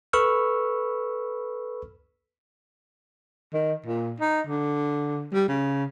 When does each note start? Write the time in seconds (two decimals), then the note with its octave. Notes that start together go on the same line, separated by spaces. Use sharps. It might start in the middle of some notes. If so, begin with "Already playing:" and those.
0.13 A4 B4 B5 C#6 E6 F6
3.53 D#3
3.86 A#2
4.20 D#4
4.47 D3
5.33 G3
5.48 C#3